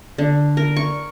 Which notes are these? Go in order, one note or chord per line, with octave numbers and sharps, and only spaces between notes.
D3
A#4
C#6